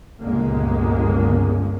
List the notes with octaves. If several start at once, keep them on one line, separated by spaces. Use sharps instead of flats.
G1 C#2 A#2 G#3 A#3 C#4